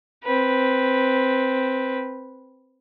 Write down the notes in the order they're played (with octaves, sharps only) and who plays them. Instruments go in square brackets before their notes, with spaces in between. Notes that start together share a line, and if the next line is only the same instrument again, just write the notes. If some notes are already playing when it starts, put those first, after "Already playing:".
[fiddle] C4 B4